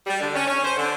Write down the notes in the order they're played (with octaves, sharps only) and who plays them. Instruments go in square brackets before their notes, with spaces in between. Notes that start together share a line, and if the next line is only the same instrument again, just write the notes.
[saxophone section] G3
D3
C#4
C#4
C5
D3